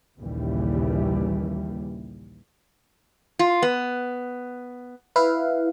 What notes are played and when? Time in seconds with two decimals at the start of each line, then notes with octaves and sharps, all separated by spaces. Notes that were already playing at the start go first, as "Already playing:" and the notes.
0.19 A#1 D#2 C#3 E3 G3
3.39 F4
3.62 B3
5.16 E4 B4 F5